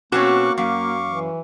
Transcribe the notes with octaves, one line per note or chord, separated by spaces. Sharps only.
B2 A#3 C4 C#4 F#4 C#6 D6 F#6
F#2 A#3 F5 C#6 D6
E3